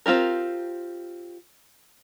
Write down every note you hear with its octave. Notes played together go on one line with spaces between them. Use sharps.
C4 F4 G4 A#4